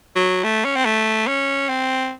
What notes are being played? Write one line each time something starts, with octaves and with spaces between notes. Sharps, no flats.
F#3
A3
C#4
C4
A3
C#4
C4